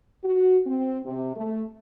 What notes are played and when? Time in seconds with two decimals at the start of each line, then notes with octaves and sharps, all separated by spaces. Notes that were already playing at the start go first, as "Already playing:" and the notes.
0.24 F#4
0.67 C4
1.05 C3
1.36 A3